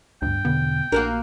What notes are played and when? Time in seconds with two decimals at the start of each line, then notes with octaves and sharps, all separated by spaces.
0.22 D2 G2 B3 D4 G5
0.45 E2 B2 D3 B3
0.92 A#1 A#3 D4 F#4 A#4